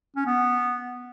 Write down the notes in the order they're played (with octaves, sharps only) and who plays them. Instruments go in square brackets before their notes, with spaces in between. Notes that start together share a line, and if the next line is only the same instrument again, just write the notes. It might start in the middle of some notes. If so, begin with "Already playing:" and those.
[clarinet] C#4
B3